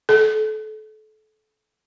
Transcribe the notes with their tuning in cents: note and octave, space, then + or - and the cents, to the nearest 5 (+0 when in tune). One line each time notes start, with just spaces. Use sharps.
A4 -30